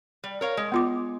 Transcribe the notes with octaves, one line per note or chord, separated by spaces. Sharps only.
G3
A#4 C#5 F5
G#3
B3 F4 D6